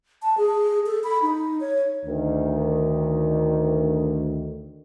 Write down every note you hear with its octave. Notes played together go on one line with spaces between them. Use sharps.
A5
G#4
A4
B5
D#4
C#5
D2 D#3